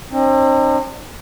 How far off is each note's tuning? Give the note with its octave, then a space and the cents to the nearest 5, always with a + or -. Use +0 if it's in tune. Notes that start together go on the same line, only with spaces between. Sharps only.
C4 +40 D#4 -45